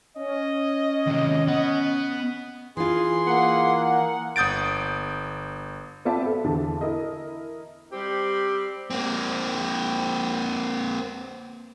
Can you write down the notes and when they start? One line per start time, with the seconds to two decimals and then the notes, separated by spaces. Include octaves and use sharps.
0.17 C#4 D#5
1.06 D#2 C3
1.48 B3
2.77 E3 F4 G#4 C6
3.27 A#3 F#5
4.36 G1 D#6 G6 A6 D7
6.05 B3 C4 F4 D5 E5 A5
6.22 B3 A4
6.44 E2 D3 A5
6.81 E4 A#4 D#5
7.92 G3 C4 G4
8.91 A#3 C4